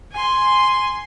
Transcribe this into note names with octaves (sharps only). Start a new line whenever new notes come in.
G#5 C6